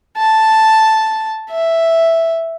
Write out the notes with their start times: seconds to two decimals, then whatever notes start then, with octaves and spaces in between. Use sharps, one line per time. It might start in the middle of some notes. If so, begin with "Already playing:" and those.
0.17 A5
1.50 E5